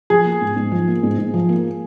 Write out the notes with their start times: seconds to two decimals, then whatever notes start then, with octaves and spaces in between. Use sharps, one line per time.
0.10 F3 G#4
0.25 A#3
0.41 G#2
0.56 G#2
0.72 F3
0.88 A#3
1.03 G#2
1.18 G#2
1.34 F3
1.49 A#3